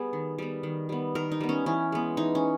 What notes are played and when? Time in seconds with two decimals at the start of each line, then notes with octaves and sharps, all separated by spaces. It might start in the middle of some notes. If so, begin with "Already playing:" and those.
Already playing: G3 B3 G#4
0.13 D#3
0.38 G3 B3
0.63 D#3
0.89 G3 B3
1.15 D#3 A#4
1.32 D#4
1.41 G3 B3
1.49 C#4
1.66 E3 C#4
1.92 G#3 B3
2.17 E3 D#4
2.35 C#4